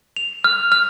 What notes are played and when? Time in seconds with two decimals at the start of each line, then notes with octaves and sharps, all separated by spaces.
0.16 F7
0.44 F6
0.72 F6